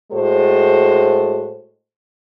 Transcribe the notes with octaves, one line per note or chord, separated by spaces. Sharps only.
A2 G#3 F#4 A4 C5